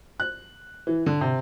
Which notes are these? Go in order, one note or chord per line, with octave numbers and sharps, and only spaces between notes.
F#6
E3
D3
C3